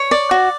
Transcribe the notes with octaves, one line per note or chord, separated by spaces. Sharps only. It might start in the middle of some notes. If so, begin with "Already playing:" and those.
Already playing: C#5
D5
F#4